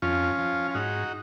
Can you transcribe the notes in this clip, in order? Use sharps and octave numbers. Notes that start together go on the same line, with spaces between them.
F2 C#4 F4
F3
F4
G#2 D#4 F#4